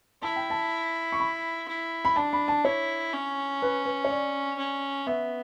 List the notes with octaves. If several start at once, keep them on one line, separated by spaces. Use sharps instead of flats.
E4 A5
G5
A5
C#6
B5
E4
B5
D4 A5
B5
A5
E4 C#5
C#4
B4
B4
C#5
D5
C#4
B3 E5